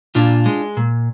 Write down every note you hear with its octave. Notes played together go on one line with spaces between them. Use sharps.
A#2 D4 F4
G#3
A#2